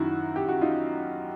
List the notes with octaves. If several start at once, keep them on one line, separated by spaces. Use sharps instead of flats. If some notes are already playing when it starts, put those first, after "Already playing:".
Already playing: F#2 D#3 E4 F#4
G4
F#4
D#4 F4